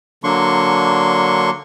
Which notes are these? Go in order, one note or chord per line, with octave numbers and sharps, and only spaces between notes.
D3 F#3 A#3 D4 C6 C#6